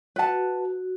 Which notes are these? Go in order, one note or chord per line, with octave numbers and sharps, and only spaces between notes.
F#4 B4 F#5 A5